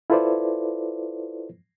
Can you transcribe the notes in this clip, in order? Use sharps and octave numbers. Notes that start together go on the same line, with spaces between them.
E4 F4 A4 B4 C5 D5